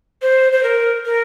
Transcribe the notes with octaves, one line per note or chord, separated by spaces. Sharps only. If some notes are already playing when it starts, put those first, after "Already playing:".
C5
C5
A#4
A#4